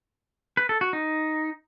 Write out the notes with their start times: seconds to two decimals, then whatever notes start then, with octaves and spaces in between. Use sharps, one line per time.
0.57 B4
0.69 A4
0.81 F#4
0.93 D#4